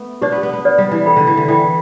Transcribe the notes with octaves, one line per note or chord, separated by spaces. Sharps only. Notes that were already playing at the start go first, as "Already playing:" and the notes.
Already playing: A3 B3
D4 G4 B4 D5
B3
B3
B3
G4 B4 D5
G3
E3
A4 G5 B5
D3
E3
D3
E3 A4 G5 B5